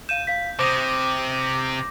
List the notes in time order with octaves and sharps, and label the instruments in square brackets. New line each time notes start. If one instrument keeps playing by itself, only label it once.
[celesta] F5 D#7 E7 [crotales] G6
[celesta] F5 B6
[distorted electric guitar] C3 [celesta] C5 D#6 [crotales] D6 A#6